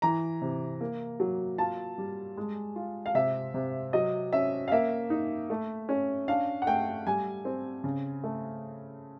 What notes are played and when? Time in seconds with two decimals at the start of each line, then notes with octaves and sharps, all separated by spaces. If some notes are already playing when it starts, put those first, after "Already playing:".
0.02 E3 A#5
0.42 C3
0.81 A#3
1.20 F#3
1.58 F4 A5
1.98 G3
2.37 G#3
2.76 F4
3.06 F5
3.15 C3 E5
3.54 C3
3.93 F#3 D#5
4.33 C#4 E5
4.68 F5
4.72 A#3 E5
5.10 D#4
5.50 A3
5.89 C#4
6.28 D4 F5
6.62 F#5
6.67 A3 G5
7.07 G3 G#5
7.45 C4
7.84 C#3
8.24 A3